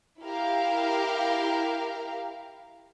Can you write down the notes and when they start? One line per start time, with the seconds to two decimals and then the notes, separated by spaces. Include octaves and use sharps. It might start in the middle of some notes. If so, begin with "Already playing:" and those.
0.22 E4 G4 A#4 F5